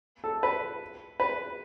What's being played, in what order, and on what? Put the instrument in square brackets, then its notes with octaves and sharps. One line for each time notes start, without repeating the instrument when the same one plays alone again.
[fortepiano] A4
B4
B4